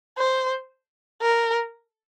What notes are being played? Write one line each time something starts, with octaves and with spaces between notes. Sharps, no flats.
C5
A#4